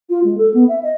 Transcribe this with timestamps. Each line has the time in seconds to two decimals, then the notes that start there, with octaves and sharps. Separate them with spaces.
0.10 F4
0.24 G#3
0.38 A4
0.54 B3
0.68 E5
0.83 D#5